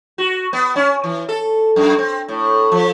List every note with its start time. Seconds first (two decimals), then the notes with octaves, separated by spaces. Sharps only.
0.18 F#4
0.53 B3
0.76 C#4
1.04 E3
1.29 A4
1.76 F#2
1.98 C4
2.28 A2
2.72 F3